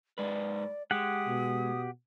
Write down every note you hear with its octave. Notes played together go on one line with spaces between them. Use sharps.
G#2 G#3 B4 D5
G#3 G4 F#5 D#6
B2